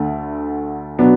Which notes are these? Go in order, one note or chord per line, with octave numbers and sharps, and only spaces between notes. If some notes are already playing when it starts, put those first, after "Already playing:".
Already playing: D2 D3 A3
B2 F#3 B3 D4